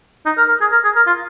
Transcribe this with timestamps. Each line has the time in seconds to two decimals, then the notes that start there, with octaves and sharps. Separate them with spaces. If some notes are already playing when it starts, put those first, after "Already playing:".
0.26 D#4
0.38 A#4
0.48 A#4
0.61 G#4
0.72 A#4
0.85 G#4
0.96 A#4
1.07 F4